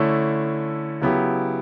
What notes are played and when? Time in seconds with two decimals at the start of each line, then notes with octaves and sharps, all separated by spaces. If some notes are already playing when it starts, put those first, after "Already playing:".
Already playing: D3 A3 C#4 E4 A4
1.01 C#3 F#3 B3 E4 G4